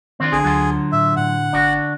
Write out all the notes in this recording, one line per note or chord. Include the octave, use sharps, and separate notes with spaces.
D#3 C4 D4 F4
A#1 D3 G#4
D2 F#3 F4
A2 E5
A2 F#5
G1 D4 F#4